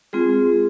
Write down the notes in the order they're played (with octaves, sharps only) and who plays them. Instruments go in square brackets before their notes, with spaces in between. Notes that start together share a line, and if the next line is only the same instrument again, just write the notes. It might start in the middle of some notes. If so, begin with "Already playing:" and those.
[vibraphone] G#3 C4 F4 G#4